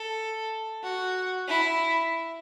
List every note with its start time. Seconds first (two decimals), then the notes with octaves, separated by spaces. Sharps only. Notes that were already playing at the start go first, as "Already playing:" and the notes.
Already playing: A4
0.83 F#4
1.48 E4